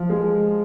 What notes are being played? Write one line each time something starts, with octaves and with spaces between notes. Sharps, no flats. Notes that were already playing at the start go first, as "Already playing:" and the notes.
Already playing: F3
G#3